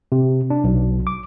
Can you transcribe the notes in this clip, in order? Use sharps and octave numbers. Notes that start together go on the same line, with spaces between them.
C3
D4
B1
D6